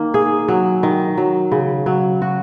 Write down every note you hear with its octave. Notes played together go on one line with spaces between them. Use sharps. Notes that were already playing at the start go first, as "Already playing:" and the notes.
Already playing: D#3 A#3
G#4
F#3
D#3
F#3
C#3
F#3
F#4